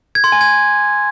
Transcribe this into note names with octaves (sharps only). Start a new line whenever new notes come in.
G#6
C6
G#5
G#6